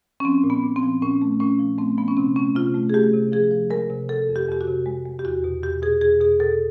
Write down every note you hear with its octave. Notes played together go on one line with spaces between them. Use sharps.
C#4
F3 C4
A#2
B3
A#2
C4
F3
A#2 C#4
A3
A#2 C#4
F3
A3 C4
F3 B3
C#4
C3 C4
A3 C#4
C3 F4
A3
G#4
A3 G4
C3
F3 G#4
F3
G#3 A#4
C3
C3 A4
F2
G4
F2 G4
F#4
C3
G#3
G#3
G4
E2 F#4
B2
E2 G4
B2 G#4
E2 G#4
B2 G#4
B2 A4